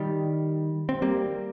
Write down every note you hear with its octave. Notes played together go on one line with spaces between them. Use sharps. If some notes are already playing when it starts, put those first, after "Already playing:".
Already playing: D#3 G3
C4
G3 A#3